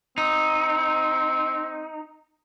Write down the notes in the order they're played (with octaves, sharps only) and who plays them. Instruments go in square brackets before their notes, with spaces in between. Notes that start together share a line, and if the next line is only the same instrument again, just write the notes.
[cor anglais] C4 [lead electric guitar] D#4